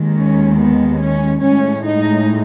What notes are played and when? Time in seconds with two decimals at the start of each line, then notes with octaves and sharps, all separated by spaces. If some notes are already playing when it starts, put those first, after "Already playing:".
Already playing: D#2 D#3 G#3
0.16 C#4
0.58 B3
1.00 C#4
1.42 A2 G#3 C#4
1.84 D#4